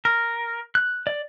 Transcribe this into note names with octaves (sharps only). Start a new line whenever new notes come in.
A#4
F#6
D5